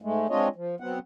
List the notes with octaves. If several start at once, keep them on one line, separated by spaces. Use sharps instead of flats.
G#2 G#3 A3
G#3 C4 D4 F4 C#5 D#5
F3
F#3 B3 C4 F#5